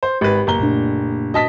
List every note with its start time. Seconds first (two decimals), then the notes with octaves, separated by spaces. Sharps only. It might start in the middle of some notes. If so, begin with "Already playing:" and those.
0.03 C5
0.21 G#1 G4 B4
0.47 F#1 A#5 G7
0.60 A#2 A3 D4
1.34 F#4 D#5 A5 B6